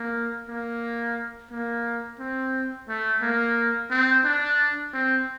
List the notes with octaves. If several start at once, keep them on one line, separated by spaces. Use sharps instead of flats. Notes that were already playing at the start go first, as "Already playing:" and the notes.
Already playing: A#3
A#3
A#3
C4
A3
A#3
C4
D4
C4